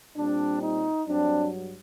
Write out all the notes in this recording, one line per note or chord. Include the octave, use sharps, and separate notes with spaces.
A#2 G3 C4 D4
D#4
G2 F#3 C4 D4